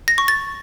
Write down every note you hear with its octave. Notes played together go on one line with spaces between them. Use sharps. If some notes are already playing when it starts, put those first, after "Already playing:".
A#6
C#6
A6